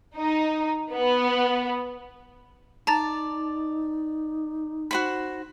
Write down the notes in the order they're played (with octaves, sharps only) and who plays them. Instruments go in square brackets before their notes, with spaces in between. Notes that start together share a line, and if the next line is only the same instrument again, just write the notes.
[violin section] D#4
B3
[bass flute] D#4 [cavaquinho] D5 [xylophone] A5 A#5 A6
[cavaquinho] F#4 C5 B5